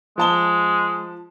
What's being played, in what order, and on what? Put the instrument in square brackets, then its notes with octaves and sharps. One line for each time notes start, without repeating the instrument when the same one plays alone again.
[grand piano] F3 A5 G7 [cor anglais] G#3